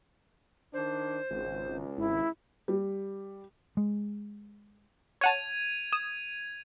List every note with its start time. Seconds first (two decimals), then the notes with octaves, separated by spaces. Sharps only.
0.74 D#3 D4 C5
1.31 G#1 C#2
1.98 G#1 E4
2.68 G3
3.77 G#3
5.21 C#5 F#5 A5 G#6 D#7 F7
5.93 D#6 E7